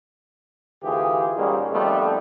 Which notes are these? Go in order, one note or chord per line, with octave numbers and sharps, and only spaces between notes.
D2 E3 F4 G4 G#4
G#2 G3 G#3 A#3 C#4
F2 D#3 G3 A3 B3